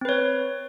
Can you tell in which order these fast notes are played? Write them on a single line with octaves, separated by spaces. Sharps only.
C4 B4 C#5